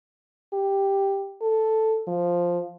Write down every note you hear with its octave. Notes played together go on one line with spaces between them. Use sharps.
G4
A4
F3